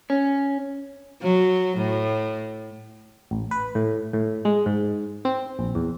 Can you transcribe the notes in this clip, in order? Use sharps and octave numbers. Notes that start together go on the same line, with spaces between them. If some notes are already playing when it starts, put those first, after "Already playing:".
C#4
F#3
A2
A1
B4
A2
A2
G#3
G#2
C4
A#1
E2